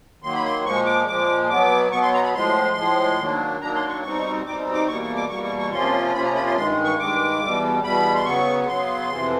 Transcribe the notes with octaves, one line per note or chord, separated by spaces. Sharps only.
D#3 F#3 A#3 C6
B5
C6
A#2 F3 G#3 C#6
D6
A#2 F3 G#3 D6
B2 F#3 B3 D6
B2 F#3 B3 C#6
C6
A#5
B5
A2 F3 G#3 C6
A2 F3 G#3
D#3 F#3 A#3 D4
D#3 F#3 A#3 D4 A#5
C6
C#6
B2 G3 C4 D#4 C#6
B2 G3 C4 D#4 D6
D6
E2 B2 G3 A#3 C#6
C#6
D6
E2 B2 G3 A#3 C#6
C#6
C#6
C3 F3 A#3 C#4 F4 C6
C3 F3 A#3 C#4 F4 B5
A#5
B5
C6
G2 D#3 G#3 C6
C#6
G2 D#3 G#3 D6
E2 B2 G3
E2 B2 G3 B5
C6
C#3 F#3 B3 C#6
C#3 F#3 B3 C6
F2 C3 E3